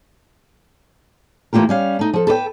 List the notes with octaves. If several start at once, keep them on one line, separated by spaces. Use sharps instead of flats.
E3 A3 A#3 F4 G4 A#4
G3 C#4 F5
A3 D#4
F3 A4
A4 B4 C#5 G5